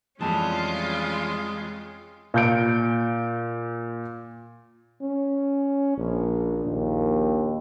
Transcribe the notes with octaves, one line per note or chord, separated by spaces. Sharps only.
F2 E3 G3 G#3 C#4 F4 A5
A#2 G6 D7
C#4
A#1
A#1 D#2